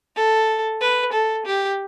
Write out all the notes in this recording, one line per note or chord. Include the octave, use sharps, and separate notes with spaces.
A4
B4
A4
G4